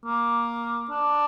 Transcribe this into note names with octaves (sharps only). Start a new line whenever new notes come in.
A#3
D4